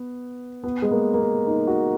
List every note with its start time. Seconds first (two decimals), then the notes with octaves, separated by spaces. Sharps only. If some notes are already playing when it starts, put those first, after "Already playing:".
Already playing: B3
0.63 B3
0.82 G#3
0.91 A#3
1.14 A#3
1.20 B3
1.47 D#4
1.67 F#4